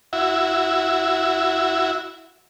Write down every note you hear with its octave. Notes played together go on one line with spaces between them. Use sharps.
E4 F#4 E5